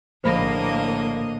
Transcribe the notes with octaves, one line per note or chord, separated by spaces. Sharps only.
A#1 A2 D3 A#3 C5 D#5 B5 A#6